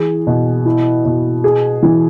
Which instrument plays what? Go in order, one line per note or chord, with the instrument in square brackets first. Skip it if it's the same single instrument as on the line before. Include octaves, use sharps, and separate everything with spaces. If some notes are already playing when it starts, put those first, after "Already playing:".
Already playing: [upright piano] E3 G#4
B2
E4
B2
G#4
E3